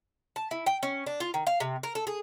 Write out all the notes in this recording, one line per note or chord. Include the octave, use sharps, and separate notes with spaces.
A5
E4
G5
C#4
D4
F4
D#3
F5
C3
A#4
A4
G#4